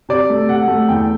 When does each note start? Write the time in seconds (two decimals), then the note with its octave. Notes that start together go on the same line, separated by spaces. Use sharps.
0.09 C3 D5
0.30 A3
0.48 C3 F#5
0.68 A3
0.88 E2 G5